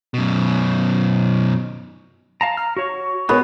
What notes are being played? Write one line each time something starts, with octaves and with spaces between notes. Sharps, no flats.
F#2 B2
F5 A5 A#5
A#5 F6
F#4 C#5 C#6
G#3 B3 F4 F#4 G#4 A#4 C#5